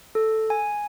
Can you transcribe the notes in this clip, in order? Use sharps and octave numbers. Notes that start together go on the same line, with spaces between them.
A4
G#5